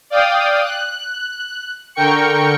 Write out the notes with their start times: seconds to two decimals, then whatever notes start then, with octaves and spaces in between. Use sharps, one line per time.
0.10 D5 F5 G5 D#6
0.63 F#6
1.95 D3 A#4 G5 C#6 C#7